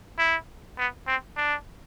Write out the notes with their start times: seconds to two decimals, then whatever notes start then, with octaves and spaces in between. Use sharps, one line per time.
0.18 E4
0.78 B3
1.07 C4
1.37 D4